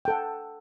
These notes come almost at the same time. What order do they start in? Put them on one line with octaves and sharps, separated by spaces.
G5 A4 F#5